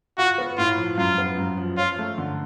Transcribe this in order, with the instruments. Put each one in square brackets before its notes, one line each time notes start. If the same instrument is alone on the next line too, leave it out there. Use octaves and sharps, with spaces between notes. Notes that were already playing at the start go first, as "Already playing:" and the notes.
[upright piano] F4 [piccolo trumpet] F#4
[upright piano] B3
[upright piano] A2 [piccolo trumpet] F4
[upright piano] F3
[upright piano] F#2 [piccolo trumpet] F4
[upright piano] B3
F#2
F3
[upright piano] C#4 [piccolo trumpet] F4
[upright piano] A3
D3